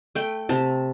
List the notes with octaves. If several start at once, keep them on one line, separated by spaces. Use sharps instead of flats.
A3 G5
C3 A5